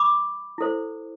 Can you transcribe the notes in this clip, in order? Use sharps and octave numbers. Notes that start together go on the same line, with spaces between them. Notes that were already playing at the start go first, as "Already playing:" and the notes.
Already playing: B5 D6
E4 A4 C5